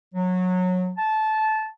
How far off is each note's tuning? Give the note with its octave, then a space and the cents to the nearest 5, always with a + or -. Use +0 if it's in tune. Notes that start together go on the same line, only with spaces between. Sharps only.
F#3 -20
A5 -15